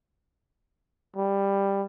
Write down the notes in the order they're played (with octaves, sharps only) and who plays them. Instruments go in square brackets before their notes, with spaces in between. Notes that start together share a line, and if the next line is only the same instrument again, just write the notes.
[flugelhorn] G3